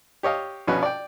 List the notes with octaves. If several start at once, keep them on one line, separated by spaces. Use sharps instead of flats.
G4 C#5 D#5 F5
A#1 B2 C#4 F#4 B4
D5 G5